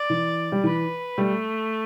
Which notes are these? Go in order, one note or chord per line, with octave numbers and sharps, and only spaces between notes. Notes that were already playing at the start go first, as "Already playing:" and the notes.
Already playing: D5
E3
G3
E3 B4
G3 A3